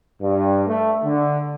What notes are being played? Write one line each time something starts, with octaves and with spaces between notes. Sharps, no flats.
G2
A3
D3